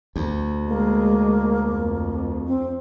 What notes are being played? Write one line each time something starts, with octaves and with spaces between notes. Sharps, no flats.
D2
G#3 A#3
F2
C4